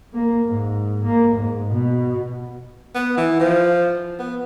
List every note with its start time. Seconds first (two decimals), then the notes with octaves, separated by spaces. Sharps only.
0.14 A#3
0.47 G#2
1.05 A#3
1.36 G#2
1.73 B2
2.95 B3
3.17 E3
3.40 F3
4.19 B3